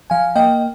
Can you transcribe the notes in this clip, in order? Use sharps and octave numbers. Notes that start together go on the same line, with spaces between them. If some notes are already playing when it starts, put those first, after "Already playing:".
F3 F5 G#5
A#3 D#5 G5